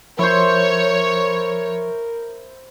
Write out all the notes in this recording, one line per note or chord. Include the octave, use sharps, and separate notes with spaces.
F3 E4 A#4 C5 C#5